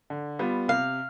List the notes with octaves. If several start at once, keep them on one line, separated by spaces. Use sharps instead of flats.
D3
G3 B3 F4
C3 F5